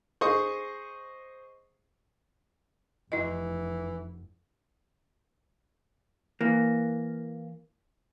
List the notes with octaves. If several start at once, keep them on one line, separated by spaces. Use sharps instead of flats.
G#4 C5 D#5 C#6 D#6
F1 E3 E4 D#5
E3 A#3